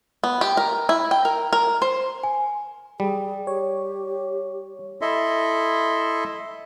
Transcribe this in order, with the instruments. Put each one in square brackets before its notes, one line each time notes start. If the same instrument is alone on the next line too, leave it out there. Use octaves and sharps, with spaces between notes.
[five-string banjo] B3
G4
A#4
E4
G5
A#4
A#4
C5
[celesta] G#5
[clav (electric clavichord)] G3 [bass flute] G#4
[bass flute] G4 [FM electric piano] C#5
[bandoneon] E4 A4 D#5 E5 C6